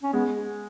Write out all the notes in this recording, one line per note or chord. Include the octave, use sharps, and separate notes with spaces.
C#4
G#3 B3